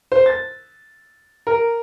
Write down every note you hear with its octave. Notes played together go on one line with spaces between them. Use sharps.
C5
A6
A#4